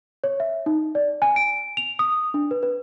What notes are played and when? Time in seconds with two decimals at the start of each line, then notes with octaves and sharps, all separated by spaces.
0.24 C#5
0.40 E5
0.66 D#4
0.95 D5
1.22 G#5
1.36 D7
1.77 F7
1.99 D#6
2.34 D4
2.51 B4
2.63 B4